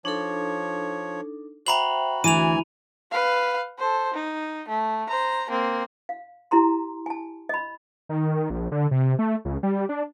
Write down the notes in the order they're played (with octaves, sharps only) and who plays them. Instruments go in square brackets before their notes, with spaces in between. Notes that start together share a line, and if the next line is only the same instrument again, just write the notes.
[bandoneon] F3 C#5 [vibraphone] D4 D#4 A4
[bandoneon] F#4 [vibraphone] C5 E5 G5 [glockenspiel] A#5 B5 F#7
[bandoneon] D2 G#5 [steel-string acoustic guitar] E3 [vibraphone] F#4 E5 [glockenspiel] D#7 F7
[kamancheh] B4 F5
A4 C5
D#4
A3
C5 A#5
A#3 C4
[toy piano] F5
E4 G4 A#5 C6
G#5 A5
D#5 B5
[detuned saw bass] D#3
A#1
D3
C3
A3
C#2
G3
D4